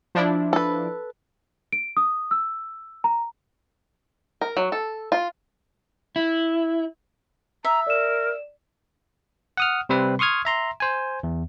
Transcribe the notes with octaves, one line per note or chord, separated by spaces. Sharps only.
F3 D4 E4
A4 B4
D7
D#6
E6
A#5
A#4
F#3
A4
F4
E4
E5 A#5
A#4 D5 E7
F#5 D#6 F6
C3 G3 C4 B4
C6 C#6 D#6 F6 G#6
E5 A#5 C6
C5 G#5
E2